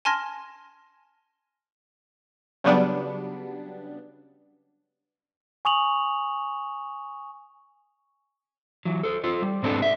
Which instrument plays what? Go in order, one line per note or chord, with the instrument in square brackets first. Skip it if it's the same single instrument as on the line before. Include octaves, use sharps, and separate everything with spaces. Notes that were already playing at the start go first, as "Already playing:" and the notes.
[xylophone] G#5 A5 C6 F6 G#6 A#6
[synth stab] C#3 F#3 G3 B3 D4
[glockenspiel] G#5 C#6 D#6 F7 F#7
[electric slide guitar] E3 F#3
A4 C5
F4 A4 C5
G3
G#2 G3 C4 D4 A4 B4
D5 E5